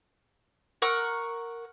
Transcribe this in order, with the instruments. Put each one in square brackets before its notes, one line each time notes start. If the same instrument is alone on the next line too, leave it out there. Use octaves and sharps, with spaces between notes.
[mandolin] A#4 F#5 C#6 E6